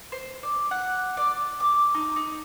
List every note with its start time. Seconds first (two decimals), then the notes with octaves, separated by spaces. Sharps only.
0.12 C5
0.43 D5
0.71 F#5
1.17 D5
1.60 D6
1.94 D#4
2.16 D#4